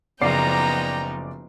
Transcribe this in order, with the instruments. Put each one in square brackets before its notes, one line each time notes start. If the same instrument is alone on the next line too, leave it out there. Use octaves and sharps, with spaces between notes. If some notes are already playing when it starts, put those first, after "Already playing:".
[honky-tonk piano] F#1 D5 C7 [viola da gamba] F3 B3 D#4 [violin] G5 A#5